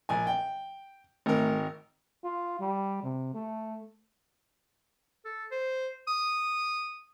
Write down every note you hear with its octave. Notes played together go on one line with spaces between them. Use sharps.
A#1 G#5
G5
G#1 A3 A#4
F4
G3
C3
A3
A4
C5
D#6